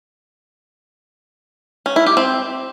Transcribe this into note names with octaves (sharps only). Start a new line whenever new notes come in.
C#4
E4
G4
C4